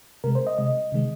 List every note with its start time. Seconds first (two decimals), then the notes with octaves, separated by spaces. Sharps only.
0.24 C3 G#3 A#4
0.35 C5
0.47 D#5
0.58 C3 G#3 D#5
0.92 C3 D#3 G#3